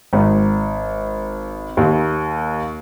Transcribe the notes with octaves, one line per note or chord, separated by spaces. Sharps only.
G#1
D#2